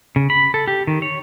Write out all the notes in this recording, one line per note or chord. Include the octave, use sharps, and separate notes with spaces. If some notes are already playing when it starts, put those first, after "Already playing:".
C#3
B5
A4
G4
D#3
C#5